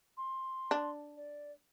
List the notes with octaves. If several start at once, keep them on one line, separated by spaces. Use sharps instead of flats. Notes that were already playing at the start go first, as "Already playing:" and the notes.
C6
D4
D5